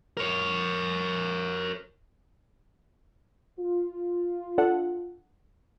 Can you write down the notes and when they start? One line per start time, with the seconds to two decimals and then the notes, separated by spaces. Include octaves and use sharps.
0.17 A#4 C#5
3.59 F4
4.58 D4 A4 F#5